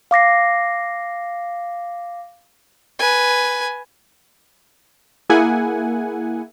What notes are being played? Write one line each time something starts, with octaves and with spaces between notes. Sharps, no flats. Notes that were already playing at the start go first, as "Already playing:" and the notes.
F5 D6 A#6 C7
B4 G#5
A#3 E4 G#4 F#5 G#5